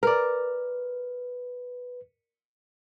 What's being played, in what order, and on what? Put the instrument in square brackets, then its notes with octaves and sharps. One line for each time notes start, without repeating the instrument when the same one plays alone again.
[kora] A#4 D5 [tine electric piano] B4